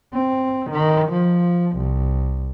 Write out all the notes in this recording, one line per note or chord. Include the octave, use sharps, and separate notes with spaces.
C4
D#3
F3
C2